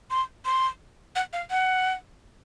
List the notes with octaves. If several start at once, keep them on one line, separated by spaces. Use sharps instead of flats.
C6
C6
F#5
F5
F#5